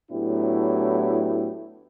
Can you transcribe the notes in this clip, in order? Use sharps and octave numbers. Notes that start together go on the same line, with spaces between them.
A2 F#3 B3 D4 E4 G4